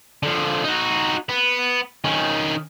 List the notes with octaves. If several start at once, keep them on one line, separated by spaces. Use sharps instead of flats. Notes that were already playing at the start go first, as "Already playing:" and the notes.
D3 F3
D#4 F#4
B3
D#3 C#4